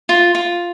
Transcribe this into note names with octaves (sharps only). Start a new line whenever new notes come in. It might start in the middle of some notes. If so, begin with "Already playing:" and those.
F4
F4